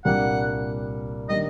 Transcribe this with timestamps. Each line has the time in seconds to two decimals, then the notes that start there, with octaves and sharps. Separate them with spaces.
0.05 C2 A#2 G3 A#3 D4 F#5
1.29 D#3 G3 A#3 D4 D#5